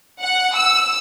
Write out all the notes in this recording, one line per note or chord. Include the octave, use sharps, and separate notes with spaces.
F#5
E6